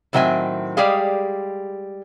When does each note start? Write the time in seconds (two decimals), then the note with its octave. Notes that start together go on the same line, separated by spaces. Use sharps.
0.13 A2 D#3 F#3 C4 E5 G#5
0.77 G3 G#3 G4 G#4 F5